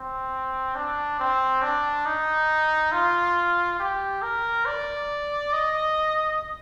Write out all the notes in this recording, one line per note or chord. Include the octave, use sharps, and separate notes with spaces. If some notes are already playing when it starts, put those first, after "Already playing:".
Already playing: C4
D4
C4
D4
D#4
F4
G4
A#4
D5
D#5